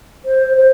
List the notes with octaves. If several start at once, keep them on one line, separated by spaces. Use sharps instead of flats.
C5
C5